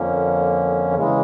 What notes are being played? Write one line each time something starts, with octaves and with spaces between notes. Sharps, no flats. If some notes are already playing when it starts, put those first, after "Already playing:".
Already playing: F2 D3 F3 A#3 C#4
C#3 E3 G#3